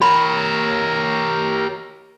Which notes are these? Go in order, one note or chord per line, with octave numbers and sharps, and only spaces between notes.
G4 A#4 C#5 B5